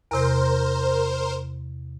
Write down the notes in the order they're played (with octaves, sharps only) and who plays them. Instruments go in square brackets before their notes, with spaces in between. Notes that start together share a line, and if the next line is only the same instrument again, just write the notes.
[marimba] E2 C3 [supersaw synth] A#4 C5